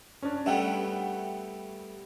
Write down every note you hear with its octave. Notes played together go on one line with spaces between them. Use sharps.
C#4 D4
G3 A3 B3 E5 F#5 G5